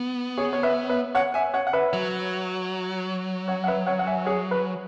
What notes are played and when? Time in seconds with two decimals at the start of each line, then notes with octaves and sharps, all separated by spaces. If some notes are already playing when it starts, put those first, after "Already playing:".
Already playing: B3
0.38 G#4 C#5
0.53 C#5
0.63 B4 E5
0.89 B4 E5
1.15 C#5 F#5
1.34 E5 G#5
1.54 C#5 F#5
1.67 F#5
1.73 B4 E5
1.93 F#3
3.48 C#5 F#5
3.64 F#5
3.67 B4 E5
3.86 C#5 F#5
3.99 F#5
4.07 E5 G#5
4.25 G#4 C#5
4.51 B4